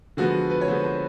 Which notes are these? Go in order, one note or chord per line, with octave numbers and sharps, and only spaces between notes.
D3 F3 G#3 B3 F#4
B4
C#5
D3 F3 G#3 B3 C5
C5